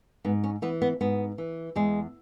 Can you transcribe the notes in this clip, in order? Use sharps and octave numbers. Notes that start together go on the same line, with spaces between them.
G#2 B3
C#4
E3 B3
B3
G#2 B3
E3
E2 G#3